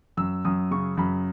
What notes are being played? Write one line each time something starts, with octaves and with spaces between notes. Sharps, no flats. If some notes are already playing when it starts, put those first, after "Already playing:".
F#2 E6
F#2 D#6
C#3 C#6
F#2 B5